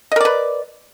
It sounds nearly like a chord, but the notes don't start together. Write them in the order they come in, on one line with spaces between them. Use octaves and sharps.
D#5 A#4 D5 B4